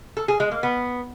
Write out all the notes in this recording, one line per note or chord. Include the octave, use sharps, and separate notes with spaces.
A4
G#4
G#3
A#3
B3